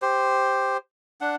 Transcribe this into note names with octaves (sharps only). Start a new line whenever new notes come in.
G4 C5
D4 F#5